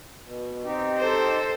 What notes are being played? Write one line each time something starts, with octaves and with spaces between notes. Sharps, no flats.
B2
C4 D#4 G4
A4 C5